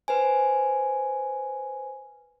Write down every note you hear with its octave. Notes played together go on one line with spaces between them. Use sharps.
B4 C5 G#5